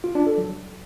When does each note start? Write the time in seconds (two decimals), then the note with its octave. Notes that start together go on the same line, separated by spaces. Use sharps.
0.04 F4
0.15 D4
0.27 A4
0.38 F#3